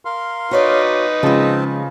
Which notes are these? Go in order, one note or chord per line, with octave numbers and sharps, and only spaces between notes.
A#4 F5 C6
D#4 F#4 B4 C#5 D5
C#3 F3 G#3 C4 A5